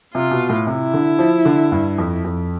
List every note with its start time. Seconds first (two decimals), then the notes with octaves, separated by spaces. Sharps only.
0.14 C3 F4
0.31 B2
0.49 A2
0.67 C3 E4
0.94 D3
1.19 F3
1.45 D3
1.72 G2
1.98 F2
2.24 F2